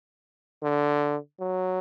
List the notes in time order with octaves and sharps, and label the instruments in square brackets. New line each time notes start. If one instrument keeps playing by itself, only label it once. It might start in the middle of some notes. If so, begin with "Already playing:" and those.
[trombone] D3
F#3